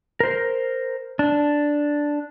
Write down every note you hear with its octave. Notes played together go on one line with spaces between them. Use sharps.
A#4 C5
D4